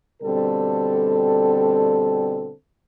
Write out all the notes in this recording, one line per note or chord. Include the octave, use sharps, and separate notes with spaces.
B2 D3 G3 C4 A4